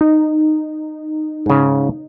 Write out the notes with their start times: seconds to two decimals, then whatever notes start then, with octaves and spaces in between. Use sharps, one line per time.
0.01 D#4
1.46 G#2 C#3